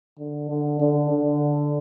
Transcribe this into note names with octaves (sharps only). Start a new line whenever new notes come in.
D3
D3
D3
D3